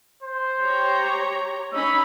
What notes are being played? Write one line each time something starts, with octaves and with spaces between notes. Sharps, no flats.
C5
G4 C#5 A#5
C#4 D#4 B5 E6